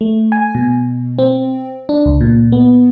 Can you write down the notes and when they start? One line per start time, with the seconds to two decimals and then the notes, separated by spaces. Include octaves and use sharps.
0.01 A3
0.32 G#5
0.55 B2
1.19 C4
1.89 D4
2.06 C#2
2.21 A#2
2.52 B3